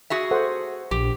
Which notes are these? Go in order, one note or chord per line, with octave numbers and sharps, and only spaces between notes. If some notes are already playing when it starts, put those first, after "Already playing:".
F#4 G#4 E5
A4 C5 F#5
A#1 G4